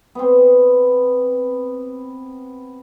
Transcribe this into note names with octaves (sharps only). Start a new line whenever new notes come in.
B3 C4